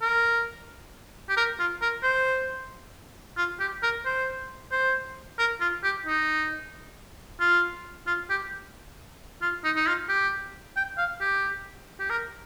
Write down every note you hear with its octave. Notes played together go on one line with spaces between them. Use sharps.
A#4
G4
A#4
F4
A#4
C5
F4
G4
A#4
C5
C5
A#4
F4
G4
D#4
F4
F4
G4
F4
D#4
D#4
F4
G4
G5
F5
G4
G4
A#4